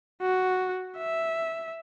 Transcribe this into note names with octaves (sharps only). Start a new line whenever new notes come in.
F#4
E5